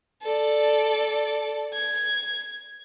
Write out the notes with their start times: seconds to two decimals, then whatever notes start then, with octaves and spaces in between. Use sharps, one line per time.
0.23 A4 D5
1.74 G#6